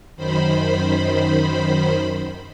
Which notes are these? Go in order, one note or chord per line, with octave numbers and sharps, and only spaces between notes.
F#2 D#3 C5 B5